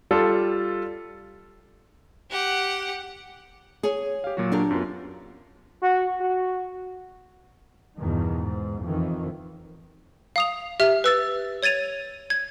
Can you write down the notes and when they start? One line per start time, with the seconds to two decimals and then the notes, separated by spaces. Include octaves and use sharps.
0.11 G3 F4 A4
2.31 G4 F#5
3.83 G#4 C#5
4.24 G4 F5
4.37 A#2 F#3 F#4
4.52 D4 G4 A#4
4.71 F#2 B3 F4
5.82 F#4
6.20 F#4
7.98 E2 G2 B2 D#3
8.35 G#2
8.82 F2 D#3 E3
10.36 F5 D#6 F7
10.80 G4 E5 F6
11.04 B4 E6 A6
11.63 C#5 G#6 A6 D#7 F7
12.30 G#6